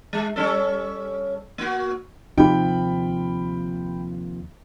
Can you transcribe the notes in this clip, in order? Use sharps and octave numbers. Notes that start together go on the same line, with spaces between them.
G#3
G3 C#4 A4
A#3 F#4
D#2 C3 F3 D#4 G4 G5 B5